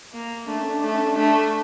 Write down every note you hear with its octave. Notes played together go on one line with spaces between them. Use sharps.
A#3
A3 D4
C#4
D4
A3 D4
C#4
D4
A3 D4